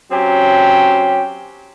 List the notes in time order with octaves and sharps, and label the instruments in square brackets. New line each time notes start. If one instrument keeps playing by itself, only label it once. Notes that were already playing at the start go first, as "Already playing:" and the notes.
[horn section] F#3 C4 C#4 G4